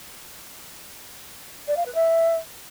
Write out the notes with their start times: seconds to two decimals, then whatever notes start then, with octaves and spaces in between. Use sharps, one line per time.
1.68 D5
1.77 F5
1.86 B4
1.95 E5